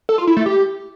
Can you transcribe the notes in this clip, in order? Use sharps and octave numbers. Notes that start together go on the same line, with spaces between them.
A4
F4
E4
A3
G4